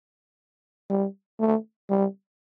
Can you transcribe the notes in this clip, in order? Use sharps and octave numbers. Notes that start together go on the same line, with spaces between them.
G3
A3
G3